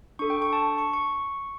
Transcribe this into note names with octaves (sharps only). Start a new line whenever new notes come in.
D4 A4 C#6
G5
C#6
A5
C#6
C#6